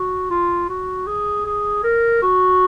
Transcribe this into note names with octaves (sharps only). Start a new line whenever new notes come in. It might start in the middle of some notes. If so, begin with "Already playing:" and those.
Already playing: F#4
F4
F#4
G#4
G#4
A#4
F#4